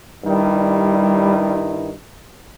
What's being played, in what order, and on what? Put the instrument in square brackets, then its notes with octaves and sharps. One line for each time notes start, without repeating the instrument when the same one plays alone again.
[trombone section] G2 D#3 E4 [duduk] G3